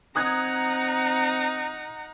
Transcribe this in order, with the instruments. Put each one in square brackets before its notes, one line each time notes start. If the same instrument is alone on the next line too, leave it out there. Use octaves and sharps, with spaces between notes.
[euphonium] C4 [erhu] D#4 [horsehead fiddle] F#5 A#5 [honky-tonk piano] D#6 F#6 G#6